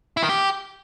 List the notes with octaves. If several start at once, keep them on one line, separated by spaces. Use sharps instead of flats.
E4
D#3
G4